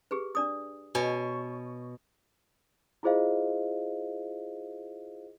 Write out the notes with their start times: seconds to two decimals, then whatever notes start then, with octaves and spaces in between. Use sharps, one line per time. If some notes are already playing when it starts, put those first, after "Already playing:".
0.11 G4 G#4 B4
0.35 D4 D5 D#6
0.95 B2 C#5 G#5
3.03 E4 F4 G#4 C5 D#5 F5